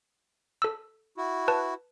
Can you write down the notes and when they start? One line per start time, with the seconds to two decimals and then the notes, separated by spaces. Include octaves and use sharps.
0.62 A4 E6
1.17 E4 F#4
1.48 B4 A5